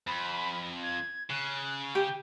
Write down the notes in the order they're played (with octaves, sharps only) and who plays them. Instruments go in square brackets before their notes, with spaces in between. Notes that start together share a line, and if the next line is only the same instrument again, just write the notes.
[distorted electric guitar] F2 [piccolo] B5
[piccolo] G#6
[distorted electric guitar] C#3 [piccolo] F#6
[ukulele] G4 [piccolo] G5